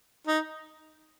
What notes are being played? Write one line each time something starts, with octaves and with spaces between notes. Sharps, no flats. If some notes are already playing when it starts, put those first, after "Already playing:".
D#4